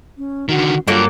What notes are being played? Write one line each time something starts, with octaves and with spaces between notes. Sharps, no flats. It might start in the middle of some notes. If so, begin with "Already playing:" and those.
C#4
D3 D#3 F#4
G2 F#3 A#3 F4 A4